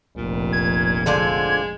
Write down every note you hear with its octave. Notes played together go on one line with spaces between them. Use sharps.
F1 A#1 A#2
G#6
D3 F3 G#3 D5